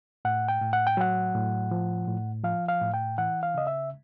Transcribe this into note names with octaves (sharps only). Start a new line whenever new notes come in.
A2 F#5
G5
A2
F#5
G5
F#3 F#5
A2
F3
A2
F3 F5
F5
A2
G5
E3 F#5
F5
C#3 D#5
E5